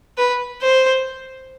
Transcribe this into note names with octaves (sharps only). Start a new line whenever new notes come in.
B4
C5